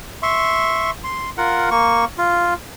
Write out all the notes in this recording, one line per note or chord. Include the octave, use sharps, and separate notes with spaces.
E5 C6 C#6
C6
F4 A#4 F#5
A#3 C#6
F4